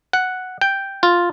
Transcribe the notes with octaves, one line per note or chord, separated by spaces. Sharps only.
F#5
G5
F4